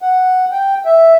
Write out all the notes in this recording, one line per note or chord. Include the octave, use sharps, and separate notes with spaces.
F#5
G5
E5